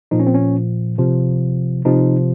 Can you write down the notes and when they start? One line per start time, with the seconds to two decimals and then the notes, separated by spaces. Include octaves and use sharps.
0.11 A#2 F3 D#4
0.20 C#4
0.27 C4
0.35 C#4
0.98 C3 F3
1.85 C3 F3 D#4